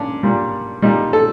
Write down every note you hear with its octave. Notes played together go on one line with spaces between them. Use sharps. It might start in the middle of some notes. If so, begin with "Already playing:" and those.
Already playing: A#2 C#4 D4
A#2 G3
A#2 G3 D#4
A4